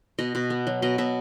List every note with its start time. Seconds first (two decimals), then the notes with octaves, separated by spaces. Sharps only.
0.19 B2 D#5
0.35 B2
0.50 B3
0.67 F#3
0.82 B2 D#5
0.98 B2 E5